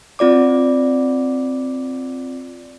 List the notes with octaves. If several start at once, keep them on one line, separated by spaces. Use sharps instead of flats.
C4 F4 D5 D6